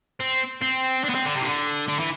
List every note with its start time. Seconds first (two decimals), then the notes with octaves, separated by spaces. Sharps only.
0.20 C4
0.62 C4
1.04 D4
1.09 B3
1.15 C4
1.25 D3
1.35 C3
1.42 E3
1.46 D3
1.88 D3
1.99 E3